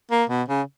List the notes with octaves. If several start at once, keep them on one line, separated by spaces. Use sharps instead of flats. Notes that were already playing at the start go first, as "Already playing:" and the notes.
A#3
B2
C#3